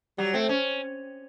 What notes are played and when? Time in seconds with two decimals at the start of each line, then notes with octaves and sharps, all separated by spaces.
0.18 F#3 G3
0.34 A3 C4
0.49 C#4